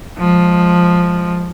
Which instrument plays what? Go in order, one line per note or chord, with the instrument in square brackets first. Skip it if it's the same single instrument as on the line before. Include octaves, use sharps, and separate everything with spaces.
[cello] F3 G#3